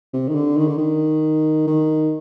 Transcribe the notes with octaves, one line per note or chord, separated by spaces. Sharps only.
C3
D#3
D3
D#3
D3
D#3
D#3